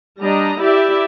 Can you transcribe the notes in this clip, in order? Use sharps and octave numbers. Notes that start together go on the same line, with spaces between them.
G3 D4 D#5 A#5
E4 G4 D5 E5